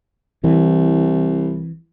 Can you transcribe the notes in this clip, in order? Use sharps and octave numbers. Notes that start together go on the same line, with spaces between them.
C2 E3